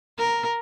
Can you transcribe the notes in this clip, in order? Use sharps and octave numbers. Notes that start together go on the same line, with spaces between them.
A#4